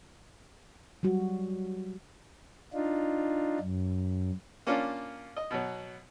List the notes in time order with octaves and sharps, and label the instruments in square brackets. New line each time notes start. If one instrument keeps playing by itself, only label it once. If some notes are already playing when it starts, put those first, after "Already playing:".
[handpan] F#3 G3 F#4
[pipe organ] D4 D#4 F4
F#2
[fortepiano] A#3 C#4 D4 F4
D#5
B2 F#3